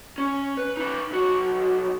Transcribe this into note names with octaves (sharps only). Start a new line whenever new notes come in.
C#4
B4
D#4 B4
B1 F#4